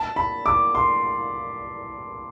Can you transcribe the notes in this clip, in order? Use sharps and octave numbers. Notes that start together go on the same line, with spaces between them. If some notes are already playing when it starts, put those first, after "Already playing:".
Already playing: A5
B5
D6
C6